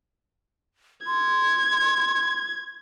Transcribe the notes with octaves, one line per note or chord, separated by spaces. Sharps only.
C6 G#6